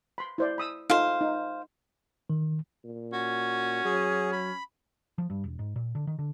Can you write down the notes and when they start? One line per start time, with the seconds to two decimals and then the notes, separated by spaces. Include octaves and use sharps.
0.18 B5 C6
0.38 E4 C5 D5
0.58 B5 D#6 E6
0.90 D#4 F4 A4 C5 F5
1.21 D#4
2.30 D#3
2.85 A#2
3.13 C#4 F#4
3.85 F#3 G#4
4.32 B5
5.18 F3
5.30 G2
5.44 E1
5.59 G#2
5.76 A#2
5.95 D3
6.07 D#3
6.19 D3